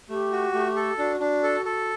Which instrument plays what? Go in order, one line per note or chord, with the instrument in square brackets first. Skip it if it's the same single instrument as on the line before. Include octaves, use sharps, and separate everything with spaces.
[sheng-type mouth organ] A3 [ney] G4
[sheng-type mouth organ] F#4
A3
A4
[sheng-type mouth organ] D4 [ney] F#4
[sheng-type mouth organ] D4
A4
A4